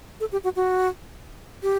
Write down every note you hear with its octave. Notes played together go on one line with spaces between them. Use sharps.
A4
G4
F#4
F#4
G4